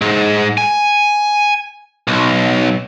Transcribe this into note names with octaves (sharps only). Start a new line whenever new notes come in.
G#2
G#5
B1